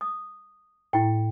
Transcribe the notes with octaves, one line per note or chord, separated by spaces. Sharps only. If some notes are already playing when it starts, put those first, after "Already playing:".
D#6
A2 E4 G5